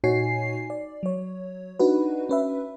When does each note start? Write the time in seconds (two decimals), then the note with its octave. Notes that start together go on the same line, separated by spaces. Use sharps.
0.04 A#2 D#4 F#4 C#5 G#5 C7
0.70 D5
1.03 F#3 C#5
1.79 D4 D#4 F#4 B4
2.29 C#4 B4 E5